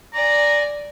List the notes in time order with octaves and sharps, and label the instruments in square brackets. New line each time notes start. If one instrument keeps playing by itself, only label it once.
[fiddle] D5 G#5 [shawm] A#5